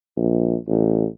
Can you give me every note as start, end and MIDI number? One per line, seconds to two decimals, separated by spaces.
0.17 0.56 34
0.68 1.05 33